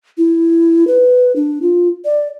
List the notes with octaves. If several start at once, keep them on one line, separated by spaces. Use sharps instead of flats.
E4
B4
D4
F4
D5